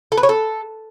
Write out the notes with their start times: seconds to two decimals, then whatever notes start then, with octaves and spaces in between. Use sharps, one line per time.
0.12 A4
0.18 B4
0.23 C#5
0.29 A4